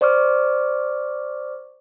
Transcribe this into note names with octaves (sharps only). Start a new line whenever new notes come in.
C5 D5 C#6 D6 F6